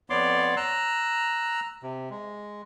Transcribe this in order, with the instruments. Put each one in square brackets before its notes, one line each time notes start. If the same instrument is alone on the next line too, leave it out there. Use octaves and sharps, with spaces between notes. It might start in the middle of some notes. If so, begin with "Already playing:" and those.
[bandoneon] F2 B3 C#5 D5 C6 D6
A#5 E6 F#6
C3
G#3